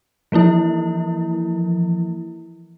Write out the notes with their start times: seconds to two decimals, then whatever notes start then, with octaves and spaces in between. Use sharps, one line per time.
0.32 E3 F3 A#3 E4